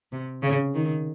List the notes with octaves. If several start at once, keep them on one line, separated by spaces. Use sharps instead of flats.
C3
C#3
D#3